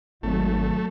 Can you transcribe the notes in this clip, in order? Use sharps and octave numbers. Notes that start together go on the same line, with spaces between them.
G#1 F#3 A3